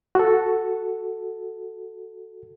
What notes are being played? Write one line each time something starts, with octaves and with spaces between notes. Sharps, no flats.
F#4 A4